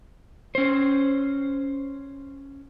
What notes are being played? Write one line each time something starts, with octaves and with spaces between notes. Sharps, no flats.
C#4 C5